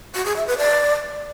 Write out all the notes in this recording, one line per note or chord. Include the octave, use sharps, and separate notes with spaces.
F#4
G#4
E5
B4
D5